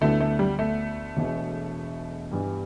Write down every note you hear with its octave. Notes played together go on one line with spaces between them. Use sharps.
D2 D3 A3 B3 E4
A3
G3
A3
E1 E2 B2
G2 E3 B3 G4